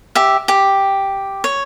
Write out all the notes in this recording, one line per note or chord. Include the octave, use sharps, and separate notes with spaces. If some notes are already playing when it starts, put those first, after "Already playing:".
G4 E5
G4
C#5